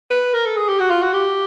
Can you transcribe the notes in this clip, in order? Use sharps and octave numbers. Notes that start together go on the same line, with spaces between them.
B4
A#4
A4
G#4
G4
F#4
F4
F#4
G4